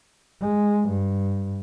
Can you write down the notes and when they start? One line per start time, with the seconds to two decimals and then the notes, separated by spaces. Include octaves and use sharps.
0.40 G#3
0.89 G2